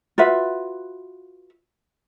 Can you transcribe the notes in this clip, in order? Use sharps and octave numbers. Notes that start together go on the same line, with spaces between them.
F4 F#4 B4 E5